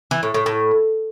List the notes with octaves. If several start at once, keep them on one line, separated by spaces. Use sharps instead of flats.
E3
A2
A2
A2